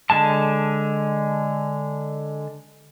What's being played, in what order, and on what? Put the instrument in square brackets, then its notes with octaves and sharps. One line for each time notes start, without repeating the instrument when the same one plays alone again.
[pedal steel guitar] D3 G#3 A5